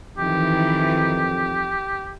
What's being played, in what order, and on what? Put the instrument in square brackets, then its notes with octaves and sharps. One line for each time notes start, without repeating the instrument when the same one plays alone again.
[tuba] F2 [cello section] D#3 E3 [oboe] G4